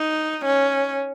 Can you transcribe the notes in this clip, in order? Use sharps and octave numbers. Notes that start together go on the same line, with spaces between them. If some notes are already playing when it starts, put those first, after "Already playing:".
Already playing: D#4
C#4